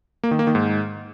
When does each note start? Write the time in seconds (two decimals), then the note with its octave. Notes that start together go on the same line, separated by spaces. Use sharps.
0.23 A#3
0.31 D#3
0.39 A#3
0.47 D#3
0.55 G#2